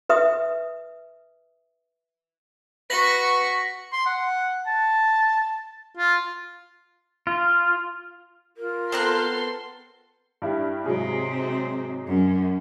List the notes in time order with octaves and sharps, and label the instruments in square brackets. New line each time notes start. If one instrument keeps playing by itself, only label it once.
[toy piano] B4 E5 D#6
[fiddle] F#4 C#6 [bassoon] B4 [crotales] A#6 B6 F#7
[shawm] C6
F#5
A5
F4
[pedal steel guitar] F4
[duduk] F4 [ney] A#4
[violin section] B3 A4 C6 [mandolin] C4 A#5 F#6
[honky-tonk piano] G2 E4 G4
[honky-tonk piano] G#2 F#3 G#4 [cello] C3 C4
[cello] F#2